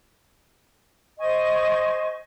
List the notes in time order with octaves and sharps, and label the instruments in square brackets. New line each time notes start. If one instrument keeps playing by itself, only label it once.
[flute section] C5 D#5 G#5 C#6